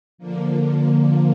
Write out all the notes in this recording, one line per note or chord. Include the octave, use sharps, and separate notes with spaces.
D3 F3 A#3